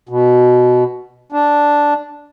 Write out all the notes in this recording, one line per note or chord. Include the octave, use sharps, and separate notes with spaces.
B2
D4